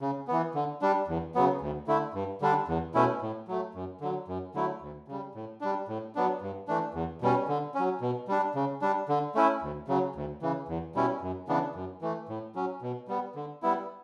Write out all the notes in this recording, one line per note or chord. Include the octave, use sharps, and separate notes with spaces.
C#3
E3 B3
D3
G3 D4
E2
C#3 F#3 B3
D2
D3 A3 E4
G2
D3 G3 D4
E2
B2 A3 C#4 E4
A2
F#3 A3
F#2
D3 F#3
F#2
D3 F#3 A3 E4
D2
C#3 G3
A2
G3 D4
A2
F#3 B3 D4
G2
E3 A3 D4
E2
B2 G3 C#4
D3
C#4
F#3
B2
G3 D4
C#3
G3 D4
D3
A3 C#4 E4
D2
C#3 F#3
D2
C#3 E3
E2
B2 G3 C#4 E4
F#2
C#3 E3 B3 D4
F#2
E3 A3
A2
F#3 C#4
B2
G3 B3
D3
G3 B3 E4